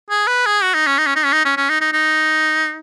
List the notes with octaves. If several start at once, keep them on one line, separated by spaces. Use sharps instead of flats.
G#4
B4
G#4
F#4
D#4
C#4
D#4
C#4
D#4
C#4
D#4
C#4
C#4
D#4
D#4
D#4